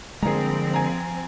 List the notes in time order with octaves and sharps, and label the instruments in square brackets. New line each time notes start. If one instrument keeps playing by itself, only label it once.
[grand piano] G1 A#3 G#4 [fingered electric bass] D3 G#3 [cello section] F3 C4 [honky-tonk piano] A#5
[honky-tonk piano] G#5 A#5